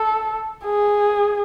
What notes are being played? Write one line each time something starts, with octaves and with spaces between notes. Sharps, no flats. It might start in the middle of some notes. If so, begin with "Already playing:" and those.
Already playing: A4
G#4